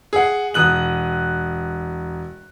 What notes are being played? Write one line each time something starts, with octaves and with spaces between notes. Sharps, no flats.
G#4 F#5
E1 D#6 F#6 F#7